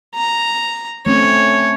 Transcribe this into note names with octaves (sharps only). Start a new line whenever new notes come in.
A#5
A3 C4 C#4 C#5